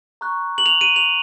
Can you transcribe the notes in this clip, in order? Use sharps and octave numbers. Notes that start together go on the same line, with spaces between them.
A#5 C#6 F#6
F#7
F7
D#7
F7